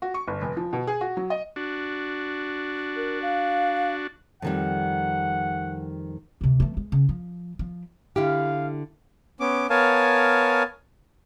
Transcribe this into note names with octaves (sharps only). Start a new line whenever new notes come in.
F#4
C#6
G1
F1
F3
B2
G#4
F#4
F#3
D#5
D4 F#4
A#4
F5
F2 D#3 G3 F#5
D2 C3
E3 A3
G#3
C#3
F3
F3
D3 E4 G4 F5
B3 C#4 D6
B3 A#4 C#5 F5 G#5 A5